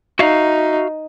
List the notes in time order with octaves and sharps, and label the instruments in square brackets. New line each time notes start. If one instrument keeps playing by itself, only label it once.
[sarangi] D#4 [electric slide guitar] F#4 E5 F5